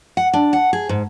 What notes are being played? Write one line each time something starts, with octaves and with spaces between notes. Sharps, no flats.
F#5
D4
F#5
G#4
G#2